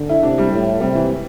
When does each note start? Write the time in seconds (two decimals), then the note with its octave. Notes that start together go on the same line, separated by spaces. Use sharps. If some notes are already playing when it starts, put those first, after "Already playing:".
Already playing: D3
0.09 E4
0.23 C3 D4
0.38 G3
0.53 A2
0.81 C3 G3
0.95 E3